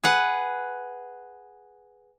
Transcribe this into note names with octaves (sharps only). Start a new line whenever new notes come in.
G#4 B4 F#5